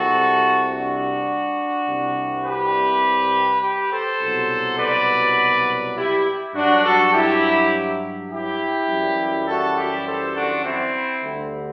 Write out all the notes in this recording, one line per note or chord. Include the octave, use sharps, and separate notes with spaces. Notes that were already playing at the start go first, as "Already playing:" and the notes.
Already playing: C2 C3 G3 F#4 A4
D4 F#4
C2 C3 G3
G4 B4
G4 B4
A4 C5
C2 B2 F#3
B4 D5
E4 G4
G2 F#3 D4 F#4
F#4 A4
E4 G4
E4 G4
F#2 E3 G3
F#4 A4
E4 G4
A4 C5
D4 F#4
C4 E4
D2 D3 G3